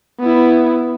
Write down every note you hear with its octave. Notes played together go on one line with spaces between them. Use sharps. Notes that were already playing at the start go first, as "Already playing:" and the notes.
B3 E4